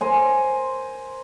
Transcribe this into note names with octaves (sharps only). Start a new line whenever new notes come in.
A#4 C5 G#5